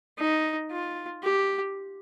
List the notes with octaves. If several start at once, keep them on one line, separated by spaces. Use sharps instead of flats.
D#4
F4
G4